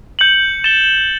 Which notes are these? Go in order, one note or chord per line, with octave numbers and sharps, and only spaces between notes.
G6 C#7 F#7
A6 E7 G7